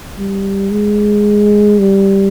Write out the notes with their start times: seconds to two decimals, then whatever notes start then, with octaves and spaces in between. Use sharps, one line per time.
0.18 G3
0.71 G#3
1.79 G3